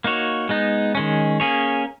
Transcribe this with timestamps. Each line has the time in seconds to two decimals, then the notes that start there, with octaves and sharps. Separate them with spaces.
0.04 A#3 D#4 F#4 C#5
0.49 G#3 B3 D#4
0.95 D#3 G#3 C#4
1.40 A#3 C#4 G#4 C#5